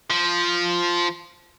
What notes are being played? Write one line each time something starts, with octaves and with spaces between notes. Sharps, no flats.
F3